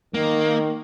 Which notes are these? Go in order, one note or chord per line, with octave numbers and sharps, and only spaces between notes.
D#3 A#3